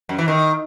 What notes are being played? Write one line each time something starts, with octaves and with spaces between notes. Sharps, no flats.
F#2
E3
D#3